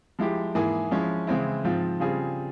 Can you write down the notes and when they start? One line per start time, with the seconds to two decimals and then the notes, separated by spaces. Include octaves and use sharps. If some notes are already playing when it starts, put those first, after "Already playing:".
0.19 F3 G#3 E4 G4
0.55 G#2 E3 A#3 E4 G#4
0.91 F3 G#3 C#4 E4
1.27 C#3 E3 G#3 C4 E4
1.64 G#2 F3 C4 F4
2.00 C#3 G3 C4 F4 G#4